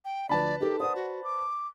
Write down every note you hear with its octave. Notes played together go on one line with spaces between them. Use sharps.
G5
D2 F3 B4 D5 A5 B5
D#4 G4 A4 A#4
C5 D5 F#5 D#6
F#4
D6